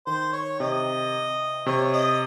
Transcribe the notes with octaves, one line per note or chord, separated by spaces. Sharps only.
D#3 C5
C#5
C3 D#5
C3 C#5
D#5